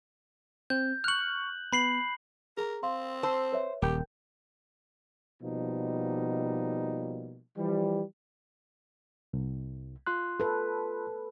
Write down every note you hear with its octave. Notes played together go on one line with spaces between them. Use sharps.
C4 G6
C#6 F6 F#6 F#7
B3 B5 C7 F#7
G#4 A#4 A#5
C4 F5 C6
C5 A5 E6
B4 C#5 E5
D#1 G4 A#4 G5 G6
B2 F3 G3 A#3 D#4
E3 F3 G3
C2
F4 C6 F#6
A4 B4